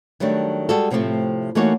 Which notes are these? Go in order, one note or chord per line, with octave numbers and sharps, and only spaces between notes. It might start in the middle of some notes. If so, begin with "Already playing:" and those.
D#3 F#3 G3 A3 D4
G3 G#3 F#4 A4
A2 C3 F3 G3 A3 C4
E3 A3 A#3 D#4 F#4 C#5